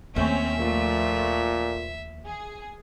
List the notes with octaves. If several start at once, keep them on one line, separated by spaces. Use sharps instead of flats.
D#2 A3 C4 C#4 E5
A#2 F3 A3
G#4